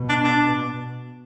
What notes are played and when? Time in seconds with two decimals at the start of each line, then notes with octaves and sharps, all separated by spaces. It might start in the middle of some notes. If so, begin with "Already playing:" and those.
Already playing: B2
0.09 D4
0.24 D4